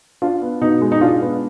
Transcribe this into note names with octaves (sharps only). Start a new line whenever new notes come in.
D4 F4
B3
B2 D#4
G#3
D#4
D4 F4
B3